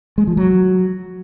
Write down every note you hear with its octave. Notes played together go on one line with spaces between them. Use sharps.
G#3
F3
F#3